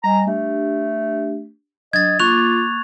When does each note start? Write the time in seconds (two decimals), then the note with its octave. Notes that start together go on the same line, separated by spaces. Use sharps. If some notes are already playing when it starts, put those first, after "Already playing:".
0.04 G3 D#5 G#5 A#5
0.27 A3 D4 G4
1.93 F#3 D4 D#5 G#6 A6
2.20 A#3 F4 C#6 D6 F#6 F7